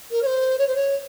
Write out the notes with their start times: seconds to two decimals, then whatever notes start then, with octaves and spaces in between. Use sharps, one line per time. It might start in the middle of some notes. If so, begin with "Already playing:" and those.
0.10 A#4
0.22 C#5
0.25 C5
0.58 C#5
0.67 C5
0.75 C#5